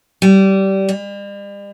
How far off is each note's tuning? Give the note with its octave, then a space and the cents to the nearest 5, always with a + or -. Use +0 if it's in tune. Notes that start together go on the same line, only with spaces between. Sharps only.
G3 -20
G3 +45